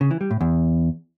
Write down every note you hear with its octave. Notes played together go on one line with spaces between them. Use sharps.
C#3
E3
G3
A2
E2